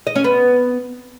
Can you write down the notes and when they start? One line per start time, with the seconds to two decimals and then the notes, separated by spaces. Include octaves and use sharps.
0.07 D#5
0.15 C#4
0.24 B3